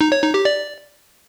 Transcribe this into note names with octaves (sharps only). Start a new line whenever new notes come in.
D#4
C#5
D#4
G4
D5